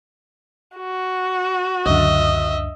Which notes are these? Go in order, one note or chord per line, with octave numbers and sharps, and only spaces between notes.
F#4
C#2 F#2 D3 D#5 E5